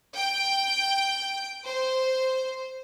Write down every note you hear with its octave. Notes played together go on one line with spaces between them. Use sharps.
G5
C5